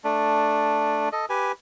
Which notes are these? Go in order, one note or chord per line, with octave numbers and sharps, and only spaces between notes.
A3 D4
A4 D#5
G4 B4 G#5